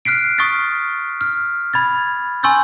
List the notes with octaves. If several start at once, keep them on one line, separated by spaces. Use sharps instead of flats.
F6 F#6 B6 C7 D7
C#6 D#6 F6 A6 B6
F6
B5 G#6 A6
G#5 C6 C#6 E6 G6 A6